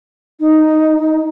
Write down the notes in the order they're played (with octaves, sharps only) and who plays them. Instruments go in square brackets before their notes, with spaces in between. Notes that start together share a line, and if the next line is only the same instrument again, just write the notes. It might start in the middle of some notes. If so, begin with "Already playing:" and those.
[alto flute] D#4